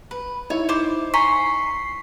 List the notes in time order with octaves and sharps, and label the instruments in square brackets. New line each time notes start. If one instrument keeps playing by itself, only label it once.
[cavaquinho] B4
[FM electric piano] D#4 E4 [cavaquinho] C#5
[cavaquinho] C5 D6
[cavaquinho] G#5 A#5 C6 [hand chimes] C#6 B6 [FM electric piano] C7